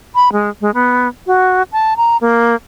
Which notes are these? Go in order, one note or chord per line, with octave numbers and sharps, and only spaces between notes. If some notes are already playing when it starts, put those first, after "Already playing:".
B5
G#3
G#3
B3
F#4
A5
A#5
A#3